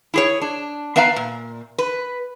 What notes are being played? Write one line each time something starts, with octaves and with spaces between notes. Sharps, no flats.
E4 G#4 C#5
D4
B3 B4 E5 F5 A#5
A#2
B4